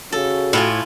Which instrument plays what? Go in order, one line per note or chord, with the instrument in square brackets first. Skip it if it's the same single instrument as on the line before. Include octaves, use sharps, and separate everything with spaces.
[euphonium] C#3 [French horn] F#4 [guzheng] A4
[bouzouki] A2 [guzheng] E4 F4 G#5